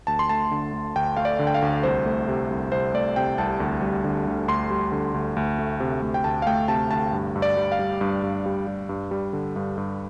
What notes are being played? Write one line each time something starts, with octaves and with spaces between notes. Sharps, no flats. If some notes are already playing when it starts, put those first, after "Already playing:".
D2 A5
C6
A3 A5
D3
D2
D2 G5
A3 F5
D5
D3
G5
F5
D2
C2 C5
A3
C3
C2
C2 C5
A3 D5
C3 G5
C2 A5
D2
G3
D3
D2
D2 C6
G3
D3
D2
D2
A3
C3
D2
G5
D2 A5
F5
A3 G5
C3 A5
D2 A5
G2
G2
D5
G3
F5
G3
G2
G2
G3
G3
G2
G3
D3
G2
G2